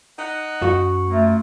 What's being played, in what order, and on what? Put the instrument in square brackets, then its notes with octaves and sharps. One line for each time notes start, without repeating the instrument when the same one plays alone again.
[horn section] D#4 F#5
[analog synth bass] F#2 [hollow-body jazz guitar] F#4
[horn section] F#3 A#3 F4 [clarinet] A3